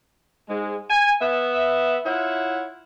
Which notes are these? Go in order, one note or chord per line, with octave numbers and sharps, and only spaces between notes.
G#2 G#3
G#5
B3 E5
E4 F4 C#5 E5 F#5